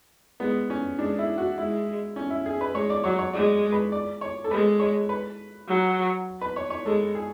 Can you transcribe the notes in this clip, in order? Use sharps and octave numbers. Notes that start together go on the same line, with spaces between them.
G#3 B3
C#4
G#3 D4
E4
F#4
G#3 E4
C#4
E4
G#4
B4
G#3 C#5
D5
F#3 C#5
C#5
G#3 D5
B4
D5
C#5
A4
G#3 B4
C#5
B4
F#3
B4
C#5
C#5
G#3 A4
G#4